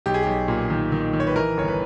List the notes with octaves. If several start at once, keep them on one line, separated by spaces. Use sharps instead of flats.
B1 G4
G#4
B1 G4
A#2
D#3
D#3
D#3
C#5
B4
E3 A#4
G1 C#5
B4